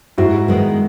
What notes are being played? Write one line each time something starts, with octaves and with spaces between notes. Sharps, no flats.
G#2 E4 F#4
D#3 G#3 B3